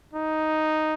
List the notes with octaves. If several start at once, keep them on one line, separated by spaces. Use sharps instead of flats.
D#4